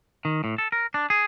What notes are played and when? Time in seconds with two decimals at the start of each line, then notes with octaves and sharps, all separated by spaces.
0.25 D#3
0.44 A2
0.58 A4
0.72 A#4
0.94 D4
1.10 G#4